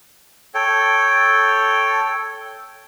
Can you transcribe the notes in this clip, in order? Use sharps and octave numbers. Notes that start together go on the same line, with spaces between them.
A4 C#5 G5